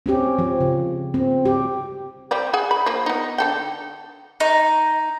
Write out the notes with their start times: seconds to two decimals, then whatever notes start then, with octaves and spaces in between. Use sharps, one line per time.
0.06 C4 C#4 G4
0.39 F3
0.61 C#3
1.14 C4
1.45 G4
2.31 G3 C4 D5
2.54 G#4 F#5 G#5
2.71 B5
2.86 F3 A#3
3.06 B3 D#4
3.38 D3 A4 G5
4.40 D#4